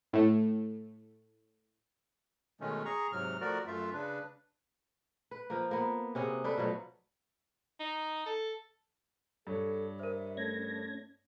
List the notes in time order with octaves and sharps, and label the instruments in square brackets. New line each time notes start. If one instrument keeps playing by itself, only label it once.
[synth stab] A2 A3
[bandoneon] B2 D#3 G#3 A3 C#4
G#4 A#5 C#6
G#2 C3 F#3 F6
F3 A3 F#4 A#4 D5
F#2 A3 F4 E5
C#3 D4 B4
[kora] B4
F3 A#3
A#3 B3
C3 C#4 F#4 G#4
D4 A4 B4
B2 F3 F#3 A3
[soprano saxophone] D#4
A4
[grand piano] G2 C#5 [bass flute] A4
[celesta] A#4 C5 [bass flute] E5
[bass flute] A3 [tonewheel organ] C#4 G#6 A#6